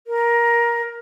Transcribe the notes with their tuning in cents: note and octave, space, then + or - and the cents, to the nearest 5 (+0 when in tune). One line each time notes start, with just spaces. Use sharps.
A#4 +15